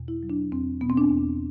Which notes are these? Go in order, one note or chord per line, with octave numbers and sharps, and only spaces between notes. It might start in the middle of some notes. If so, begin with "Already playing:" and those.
Already playing: E2 B2
E4
F#3
D4
E2 C4
B2 B3
C4
D4
E2